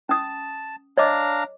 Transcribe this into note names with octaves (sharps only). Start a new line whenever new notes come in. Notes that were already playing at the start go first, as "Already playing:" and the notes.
C#4 A5 D#6
D4 C#5 D#5 F5 A#5 D6